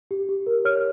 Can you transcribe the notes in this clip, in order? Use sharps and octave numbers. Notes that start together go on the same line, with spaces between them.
G4
G4
A#4
C#5 F6